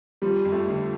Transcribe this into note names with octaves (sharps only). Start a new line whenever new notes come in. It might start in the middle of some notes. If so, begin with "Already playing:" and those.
F3 G3
F2
A3
D3